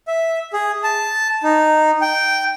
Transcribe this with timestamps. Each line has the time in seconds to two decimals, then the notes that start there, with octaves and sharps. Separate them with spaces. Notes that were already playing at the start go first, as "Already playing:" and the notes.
0.08 E5
0.53 G#4
0.83 A5
1.43 D#4
2.01 G5